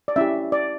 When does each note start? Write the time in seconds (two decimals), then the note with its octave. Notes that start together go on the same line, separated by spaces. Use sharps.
0.08 D5
0.16 C#4 E4 G4 E5
0.52 D5